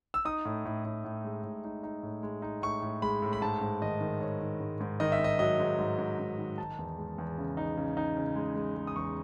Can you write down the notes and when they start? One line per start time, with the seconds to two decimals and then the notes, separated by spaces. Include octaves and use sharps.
0.14 E6
0.25 D#4 D#6
0.45 A2
0.65 A2
0.85 A2
1.04 A2
1.24 G#3
1.43 A2
1.64 D#4
1.83 D#4
2.03 A2
2.23 G#3
2.42 D#4
2.62 A2 C#6
2.82 A2
3.02 G#3 B5
3.22 A2
3.33 B5
3.42 G#2 A5
3.61 G#2
3.82 D#3 D#5
4.01 D#3
4.21 D#3 C#5
4.41 D#3
4.60 G#2
4.80 G#2
5.00 D#3 D#5
5.12 E5
5.19 D#3
5.24 D#5
5.39 F#3 D#5
5.59 G#2
5.79 G#2
5.98 G#2
6.19 G#2
6.38 D#3
6.58 D#4 A5
6.79 E2
6.98 G#3
7.18 E2
7.38 C#3
7.57 D#4
7.77 C#3
7.97 D#4
8.17 C#3
8.36 G#3
8.55 G#3
8.76 G#3
8.87 D#6
8.96 E2 C#6